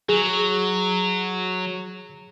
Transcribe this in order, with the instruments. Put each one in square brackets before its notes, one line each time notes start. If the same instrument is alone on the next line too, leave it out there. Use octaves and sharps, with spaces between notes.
[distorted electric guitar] F#3 [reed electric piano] G#4